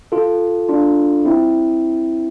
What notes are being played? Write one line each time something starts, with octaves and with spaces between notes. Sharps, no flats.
F4 A4
D4 F4
C4 E4